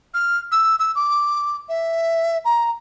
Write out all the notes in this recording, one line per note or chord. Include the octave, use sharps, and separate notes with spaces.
F6
E6
E6
D6
E5
A#5